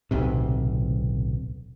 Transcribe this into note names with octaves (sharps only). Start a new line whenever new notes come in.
D1 B1 C3